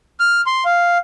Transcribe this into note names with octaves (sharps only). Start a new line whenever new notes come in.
F6
C6
F5